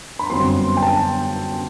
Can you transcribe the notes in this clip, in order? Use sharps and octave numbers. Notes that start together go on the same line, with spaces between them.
B5
G1 F#2 F#3 C4 C6
G5
A5